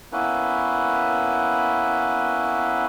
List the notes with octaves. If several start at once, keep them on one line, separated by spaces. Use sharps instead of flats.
A#3 B3 C#4 E4 B4